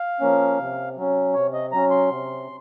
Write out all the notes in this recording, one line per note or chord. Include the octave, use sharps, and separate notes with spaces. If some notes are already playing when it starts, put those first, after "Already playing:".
Already playing: F5
F3 A#3 C#4
C3
F#3 C#4
C3 C#5
D#5
F#3 C#4 A#5
C6
C3